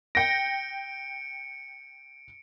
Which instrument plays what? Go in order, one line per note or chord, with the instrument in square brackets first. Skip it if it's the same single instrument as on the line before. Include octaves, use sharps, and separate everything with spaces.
[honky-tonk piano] G5 A#6 [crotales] C#7 D7